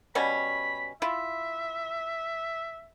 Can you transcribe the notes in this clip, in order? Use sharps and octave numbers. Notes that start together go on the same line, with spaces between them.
B2 G3 C#4 B5
E4 F4 E5